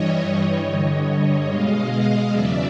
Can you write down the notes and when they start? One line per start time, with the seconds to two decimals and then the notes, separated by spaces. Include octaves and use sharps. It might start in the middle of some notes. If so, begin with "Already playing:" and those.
Already playing: G2 E3 G3 C#5 D#5
0.63 G2 D3 G3
1.47 B2 G#3 D#5 F5
2.30 E2 C#3 F#3 D5 E5